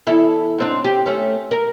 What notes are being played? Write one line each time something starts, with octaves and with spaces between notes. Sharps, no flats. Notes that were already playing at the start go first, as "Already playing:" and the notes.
E2 E4 A4
G#2 C4 D4
G4
A3 C#4
A#4